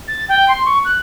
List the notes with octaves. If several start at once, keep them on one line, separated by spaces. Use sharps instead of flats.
A6
G5
C6
C#6
F#6